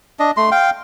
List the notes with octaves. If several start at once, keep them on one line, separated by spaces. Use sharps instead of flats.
D4 D#5
A3 C6
F5 G5